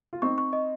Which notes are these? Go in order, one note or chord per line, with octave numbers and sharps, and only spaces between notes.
F4
C4 D#4 C#6
C#6
D#5